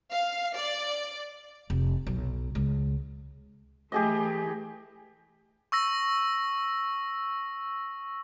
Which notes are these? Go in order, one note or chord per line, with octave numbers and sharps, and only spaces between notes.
F5
D5
F1
B1
C#2
E3 A3 G4 G#4 D#5
C#6 E6 A#6